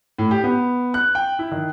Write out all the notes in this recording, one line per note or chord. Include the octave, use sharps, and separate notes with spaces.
A2
G4
B3
F#6
G5
E4
D#3